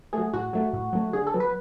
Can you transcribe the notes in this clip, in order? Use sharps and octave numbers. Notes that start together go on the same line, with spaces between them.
F#3 A3 G#4
A2 F#4
F#3 A3
A2
F#3 A3
D3 G#4
A4
F#3 B3
B4